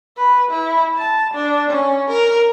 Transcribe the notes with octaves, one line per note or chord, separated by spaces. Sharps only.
B4
E4
A5
D4
C#4
A#4